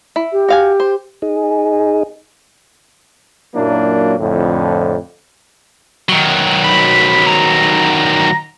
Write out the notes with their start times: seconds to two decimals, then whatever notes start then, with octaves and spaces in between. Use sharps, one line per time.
0.16 E4
0.32 G4
0.48 F#4 F5 G#5
0.80 C5
1.22 D#4 G#4
3.55 F#2 A#2 F#3 A#3 D4 E4
4.20 F2 A2 D3
6.09 D#3 F#3
6.64 B5
7.27 A#5